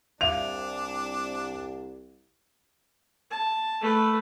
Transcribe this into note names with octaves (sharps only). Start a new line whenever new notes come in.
C2 D4 E5 F5 F7
A5
A3 B4